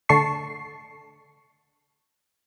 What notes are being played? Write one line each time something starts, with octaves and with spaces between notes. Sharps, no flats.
D3 A3 A5 C#6 C7